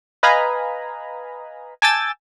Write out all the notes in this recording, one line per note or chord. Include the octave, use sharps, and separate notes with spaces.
B4 D#5 F5 G#5 A#5 B5
G#5 A5 D6 E6 G6 A6